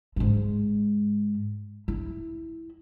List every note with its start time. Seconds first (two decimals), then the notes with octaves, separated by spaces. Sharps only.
0.16 G#2 G#3
1.88 E4